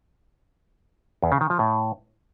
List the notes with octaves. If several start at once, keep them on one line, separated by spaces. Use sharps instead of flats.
E2
C#3
D#3
F3
A2